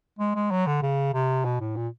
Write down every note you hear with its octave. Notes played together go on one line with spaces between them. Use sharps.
G#3
G#3
F#3
D3
C#3
C3
B2
A2
A#2